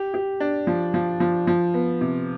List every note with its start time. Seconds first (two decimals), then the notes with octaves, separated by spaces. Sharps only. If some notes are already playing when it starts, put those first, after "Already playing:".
Already playing: G4
0.14 G4
0.40 D4
0.67 F3
0.94 F3
1.20 F3
1.47 F3
1.74 B3
2.01 C3